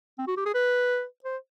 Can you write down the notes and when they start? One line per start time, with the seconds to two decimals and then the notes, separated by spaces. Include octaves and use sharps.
0.18 C4
0.27 F#4
0.37 G4
0.46 G#4
0.54 B4
1.24 C5